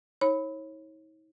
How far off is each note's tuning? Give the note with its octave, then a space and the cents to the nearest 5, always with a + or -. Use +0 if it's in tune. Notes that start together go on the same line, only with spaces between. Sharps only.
D#4 +45 C#5 -30 B5 +10